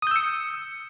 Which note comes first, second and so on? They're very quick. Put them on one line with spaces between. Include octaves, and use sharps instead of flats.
D#6 G6 E6 C#7